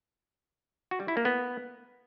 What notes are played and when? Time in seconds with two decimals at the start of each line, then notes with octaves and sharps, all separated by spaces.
0.91 F#4
1.00 G3
1.08 E4
1.17 A#3
1.25 B3